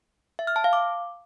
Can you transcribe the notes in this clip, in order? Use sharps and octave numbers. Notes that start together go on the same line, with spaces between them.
E5
F6
A5
F5
D6